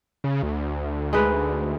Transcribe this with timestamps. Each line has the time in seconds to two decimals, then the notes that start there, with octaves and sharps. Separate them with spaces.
0.24 C#3
0.43 D2
1.13 G#3 D#4 B4